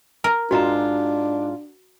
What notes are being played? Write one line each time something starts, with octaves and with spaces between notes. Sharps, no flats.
A#4
G#2 D4 F4 F#4 A#5